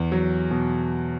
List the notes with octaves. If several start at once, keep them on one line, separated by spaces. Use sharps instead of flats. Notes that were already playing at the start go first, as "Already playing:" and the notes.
Already playing: E2
F#3
B2